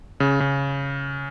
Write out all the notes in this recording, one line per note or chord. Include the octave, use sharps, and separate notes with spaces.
C#3
C#3